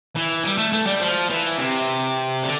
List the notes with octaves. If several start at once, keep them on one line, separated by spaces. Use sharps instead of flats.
E3
G3
A3
A3
G3
F3
E3
C3
D3